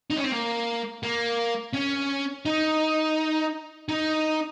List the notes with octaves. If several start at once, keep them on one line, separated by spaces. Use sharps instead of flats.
D#4
C#4
C4
A#3
A#3
C#4
D#4
D#4